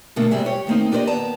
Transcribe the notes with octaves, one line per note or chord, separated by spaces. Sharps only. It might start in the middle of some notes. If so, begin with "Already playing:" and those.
B2 D3 A3 A#3
G#2 C3 G3 G#4 E5
G4 C#5
D#3 A3 A#3 C4 D#4
D4 G4 A#4 C5 D5 D#5
D#2 B3 A5 A#5